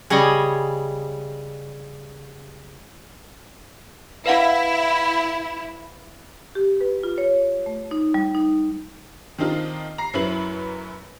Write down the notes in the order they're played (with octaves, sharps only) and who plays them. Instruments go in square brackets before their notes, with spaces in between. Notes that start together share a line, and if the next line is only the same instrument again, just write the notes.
[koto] C#3 G3 C#5 D#5 G#5
[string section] E4 [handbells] B4 F5 F#5
[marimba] G4
B4
F4
C#5
A3
D#4
G3
D#4
[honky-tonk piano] D#3 C4 D4 D#4 F4
A#5 C7
F#2 F#3 E4 B4 F#7